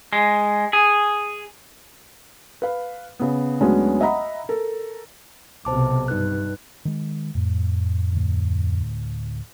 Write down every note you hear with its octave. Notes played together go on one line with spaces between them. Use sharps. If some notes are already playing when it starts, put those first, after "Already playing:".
G#3
G#4
B4 F5
C#3 B3
D2 F#3 G#3 B3 C#4 D4
D#5 E5 F#5 A#5 B5
A4 A#4
B1 C3 C5 A5 D6
G2 D#4 B4 F#6
D#3 G#3
F2 A2
D2 A2